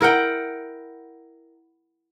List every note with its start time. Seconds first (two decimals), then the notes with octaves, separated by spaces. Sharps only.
0.01 E4 A#4 F#5 G5